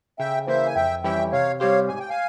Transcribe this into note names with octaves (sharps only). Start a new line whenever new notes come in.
C#3 E5 G5
E3 A#3 C5 E5
G#5
F2 E5 G5
E3 G3 C#4 E4 E5 G5
C3 C#5 F5
G3 C4 G4 C5 C#5 F5
G#2 G#5
G5
F5 G#5